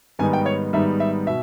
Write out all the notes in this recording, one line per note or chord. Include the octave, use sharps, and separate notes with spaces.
G#2 D#3 G3 B3 D#4 G#5
G5
C#5
G#2 D#3 G3 B3 D#4 E5
E5
B2 E5